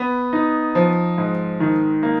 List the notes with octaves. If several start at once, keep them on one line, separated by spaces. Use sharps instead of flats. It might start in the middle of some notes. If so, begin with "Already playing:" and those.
Already playing: B3
D#4
F3
G#2
D#3
A#3